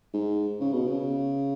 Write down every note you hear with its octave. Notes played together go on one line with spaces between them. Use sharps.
G#2
C#3
B2
C#3